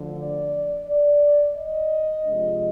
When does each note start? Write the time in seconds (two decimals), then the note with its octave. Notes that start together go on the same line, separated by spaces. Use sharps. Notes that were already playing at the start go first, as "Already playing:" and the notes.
Already playing: D2 D3 F3
0.18 D5
0.87 D5
1.56 D#5
2.26 C3 F3 G#3 D4